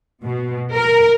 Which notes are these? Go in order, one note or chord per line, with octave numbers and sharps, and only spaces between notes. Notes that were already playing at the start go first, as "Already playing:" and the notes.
B2
A#4